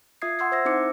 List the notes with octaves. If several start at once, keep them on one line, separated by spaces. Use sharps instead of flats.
F4 E5 D#6 G#6 C7
F#5 C6 E6 G#6 C7
C5 E5 E6 A#6
C4 D#4 E4 C5 D6 C#7